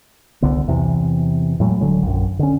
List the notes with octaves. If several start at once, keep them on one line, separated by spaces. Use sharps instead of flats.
C2 D3 B3
E2 C3 E3
A2 F#3 G#3
D#1 D3 F#3 G#3
A#1 F#2
D3 C#4